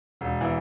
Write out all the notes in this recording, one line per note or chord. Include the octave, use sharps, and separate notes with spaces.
E1
E3